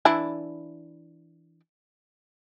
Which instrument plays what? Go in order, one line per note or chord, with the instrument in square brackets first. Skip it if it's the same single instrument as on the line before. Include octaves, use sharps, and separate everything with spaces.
[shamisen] E3 D4 E4